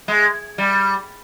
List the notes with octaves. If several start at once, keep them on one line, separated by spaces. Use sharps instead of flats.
G#3
G3